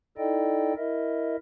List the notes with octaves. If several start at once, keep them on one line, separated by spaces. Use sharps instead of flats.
D#4 E4 A4 D5 D#5 G5
E4 A#4 D#5 E5